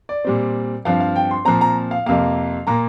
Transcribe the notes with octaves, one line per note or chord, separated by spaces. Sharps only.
D5
A#2 G3 C4
G2 F3 C4 F5
F5
G5
C6
A#2 F3 C4 A#5
A#5
F5
F2 C3 A#3 F5
A#2 A#3 A#5